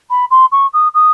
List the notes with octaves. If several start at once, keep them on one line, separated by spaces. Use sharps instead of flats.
B5
C6
C#6
D#6
D#6